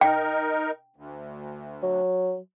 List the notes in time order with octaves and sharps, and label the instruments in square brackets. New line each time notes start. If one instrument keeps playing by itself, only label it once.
[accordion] D#4 A#4 [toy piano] G5
[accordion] D2
[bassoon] F#3